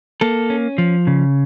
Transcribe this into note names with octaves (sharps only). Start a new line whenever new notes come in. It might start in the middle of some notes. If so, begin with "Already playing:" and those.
A#3 A4
C#4
F3
C#3